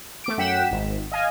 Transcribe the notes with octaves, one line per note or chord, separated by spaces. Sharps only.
A3 D6 D7
F#2 F#5 G5 B6 E7
G#1
D#5 F5 G#5